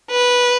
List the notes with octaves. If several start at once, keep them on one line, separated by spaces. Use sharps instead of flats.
B4